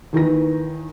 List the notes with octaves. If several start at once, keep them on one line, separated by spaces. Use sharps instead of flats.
D#2 D#3 E3 B4 A#6